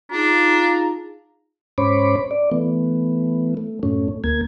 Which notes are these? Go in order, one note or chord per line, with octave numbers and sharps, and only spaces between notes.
D4 D#4 F4 G#4 A5 A#5
G#2 C#4 C5 C#5 B5 D6
D5
E3 A3 B3
A3
F#2 A2 A3 C#4
D2 A#3 G#6